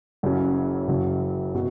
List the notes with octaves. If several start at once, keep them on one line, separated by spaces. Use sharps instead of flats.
F#1 F#2 C#3 F#3 C#4
F#1 F#2 C#3 F#3
B2 F#3